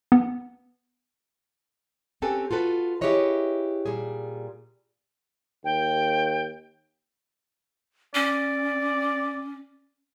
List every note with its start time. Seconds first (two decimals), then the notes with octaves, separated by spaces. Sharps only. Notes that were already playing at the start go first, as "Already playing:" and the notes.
0.12 B3
2.22 C4 C#4 G4 A4 B4 G#5
2.51 F4 F#4 A4 B4
3.01 E4 G4 G#4 B4 C#5 D#5
3.86 A#2 G3 G#4
5.64 D#2 G5
8.15 C#4 D5